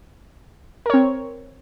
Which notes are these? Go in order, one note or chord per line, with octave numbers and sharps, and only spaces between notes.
C4 A#4 C#5